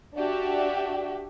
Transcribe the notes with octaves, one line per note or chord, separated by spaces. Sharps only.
D4 F#4 G4 E5